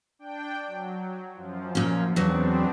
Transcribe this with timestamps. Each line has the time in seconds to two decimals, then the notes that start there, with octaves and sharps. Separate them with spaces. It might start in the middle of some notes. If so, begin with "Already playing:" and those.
0.19 D4 G5
0.67 F#3
1.34 F#2 F3
1.75 A#2 C#4
2.16 E2 F#3 B3 C4 D4